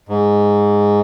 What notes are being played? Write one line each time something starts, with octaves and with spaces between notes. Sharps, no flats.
G#2